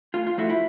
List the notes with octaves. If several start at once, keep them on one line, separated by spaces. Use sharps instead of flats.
A2 F4
F4
F3 A3 E4 F#4
E4